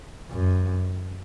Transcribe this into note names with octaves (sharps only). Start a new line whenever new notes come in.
F#2